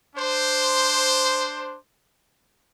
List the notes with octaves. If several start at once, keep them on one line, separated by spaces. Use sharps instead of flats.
D4 C5